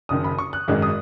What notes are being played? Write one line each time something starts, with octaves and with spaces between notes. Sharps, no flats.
F#1 F#2 D#3 D#6
B5
C#6
F#6
G#1 F#2 D#3 G#3 D#4 F#6
D#6